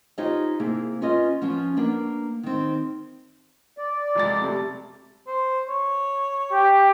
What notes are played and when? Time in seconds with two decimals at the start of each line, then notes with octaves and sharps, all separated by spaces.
0.18 D#4 F4 G4 C5 C#5 D#5
0.60 C3 A#3 E4 G#4
1.02 C#4 F4 B4 C#5 D#5
1.42 F3 B3 C#4 F4
1.77 A#3 B3 D4
2.43 D#3 C4
3.78 D5
4.15 F1 G#3 A6
4.42 C3 G3 A3
5.27 C5
5.69 C#5
6.52 G4